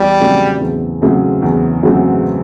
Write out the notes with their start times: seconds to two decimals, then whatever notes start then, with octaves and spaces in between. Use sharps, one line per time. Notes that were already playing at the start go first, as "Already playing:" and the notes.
Already playing: E2 G3
0.20 C#3 F#3 A3 C4
0.61 E2
1.02 C#3 F#3 A3 C4
1.42 E2
1.83 C#3 F#3 A3 C4